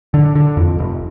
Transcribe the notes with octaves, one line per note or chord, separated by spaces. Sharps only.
D3
D3
F2
F1